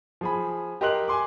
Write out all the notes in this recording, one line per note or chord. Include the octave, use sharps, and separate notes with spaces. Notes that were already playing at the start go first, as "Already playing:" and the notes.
F3 G#4 B5
G4 A#4 D#5 C6 F#6 F#7
G#5 C6 D6